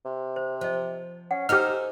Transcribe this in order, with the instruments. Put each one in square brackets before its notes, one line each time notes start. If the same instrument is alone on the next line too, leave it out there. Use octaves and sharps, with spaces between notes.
[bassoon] C3
[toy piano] C5
[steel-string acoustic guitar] F3 [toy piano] C5 D#5
[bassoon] C#4 [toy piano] F#5
[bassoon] D#4 [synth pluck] G4 F6 [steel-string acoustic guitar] A4 C5 G#5